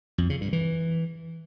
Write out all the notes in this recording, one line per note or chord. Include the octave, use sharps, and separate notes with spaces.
F2
C#3
G2
E3